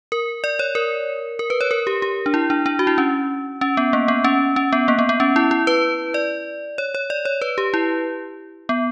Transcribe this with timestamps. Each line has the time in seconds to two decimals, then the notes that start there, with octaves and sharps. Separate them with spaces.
0.12 A#4
0.44 D5
0.59 C#5
0.75 A#4
1.39 A#4
1.50 B4
1.61 C#5
1.71 A#4
1.87 G4
2.02 G4
2.26 D4
2.34 E4
2.50 D4
2.66 D4
2.79 F#4
2.87 E4
2.98 C#4
3.61 C#4
3.77 B3
3.93 A#3
4.08 B3
4.24 C#4
4.56 C#4
4.73 B3
4.88 A#3
4.99 B3
5.09 B3
5.20 C#4
5.36 E4
5.51 E4
5.67 B4
6.14 D5
6.78 C#5
6.95 C#5
7.10 D5
7.25 C#5
7.42 B4
7.58 G4
7.74 E4
8.69 B3